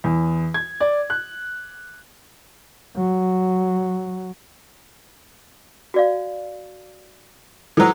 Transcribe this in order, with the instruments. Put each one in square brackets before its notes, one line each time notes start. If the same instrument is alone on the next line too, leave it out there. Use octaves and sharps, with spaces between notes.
[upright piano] E2
G#6
D5
F#6
[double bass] F#3
[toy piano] F#4 D5 F5
[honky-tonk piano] E3 F#3 [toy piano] A4 C5